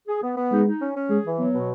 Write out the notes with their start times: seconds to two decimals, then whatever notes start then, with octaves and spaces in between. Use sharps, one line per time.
0.08 G#4
0.22 B3
0.37 B3
0.51 G#3 D#4
0.66 D#4
0.81 C#4
0.96 C#4
1.09 G#3 G#4
1.25 E3
1.39 F#3 B3
1.54 B2